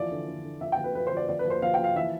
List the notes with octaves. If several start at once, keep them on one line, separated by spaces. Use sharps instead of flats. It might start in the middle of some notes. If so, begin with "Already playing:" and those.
Already playing: E3 F3 D5
D3
D3
D3
F3 E5
G5
F3
B4
F3 B4
C5
F3 D5
F3 D5
B4
F3
C5
F3 F5
G5
F3 F5
E3 E5